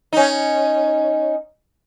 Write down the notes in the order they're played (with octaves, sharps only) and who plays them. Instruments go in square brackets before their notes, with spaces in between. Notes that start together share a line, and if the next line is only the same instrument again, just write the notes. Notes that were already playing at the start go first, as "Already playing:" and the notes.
[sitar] C#4 D#4